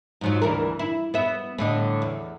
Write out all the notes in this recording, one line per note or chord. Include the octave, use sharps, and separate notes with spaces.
G#2 F3 F#3
D2 E3 A#4
E4
B3 E5
A2 D3 D#5
E2